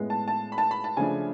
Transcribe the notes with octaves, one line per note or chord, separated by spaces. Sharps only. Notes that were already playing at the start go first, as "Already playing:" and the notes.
Already playing: A2 G#3 B3
A5
A5
B5
A5
B5
A5
C#3 F3 A3 D4 G#5